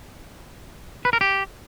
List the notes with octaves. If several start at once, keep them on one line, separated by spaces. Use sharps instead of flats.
B4
A#4
G4